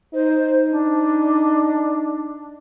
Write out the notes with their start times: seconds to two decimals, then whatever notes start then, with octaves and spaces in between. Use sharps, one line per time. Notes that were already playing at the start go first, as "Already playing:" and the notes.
0.14 D#4 C5
0.71 D4